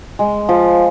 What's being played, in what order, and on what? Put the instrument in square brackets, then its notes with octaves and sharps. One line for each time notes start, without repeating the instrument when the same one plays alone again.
[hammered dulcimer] G#3
F3